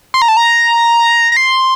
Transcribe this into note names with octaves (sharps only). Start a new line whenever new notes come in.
C6
A#5
A5
A#5
A#5
C6